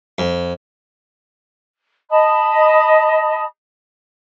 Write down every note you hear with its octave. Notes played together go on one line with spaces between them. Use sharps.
F2
D#5 A5 B5 D#6